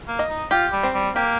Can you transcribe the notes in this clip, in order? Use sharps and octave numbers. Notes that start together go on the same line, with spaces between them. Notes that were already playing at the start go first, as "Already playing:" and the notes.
A#3
D#5
D#4
F4 G4
G3
C4
G3
A#3 G4